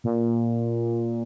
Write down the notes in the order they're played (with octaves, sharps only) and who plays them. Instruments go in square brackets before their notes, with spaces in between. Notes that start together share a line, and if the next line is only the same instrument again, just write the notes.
[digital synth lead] A#2